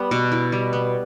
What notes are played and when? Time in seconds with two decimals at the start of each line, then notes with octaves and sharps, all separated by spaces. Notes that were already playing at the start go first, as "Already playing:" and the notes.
Already playing: G3 B3
0.11 B2
0.32 E4
0.52 G3
0.73 B3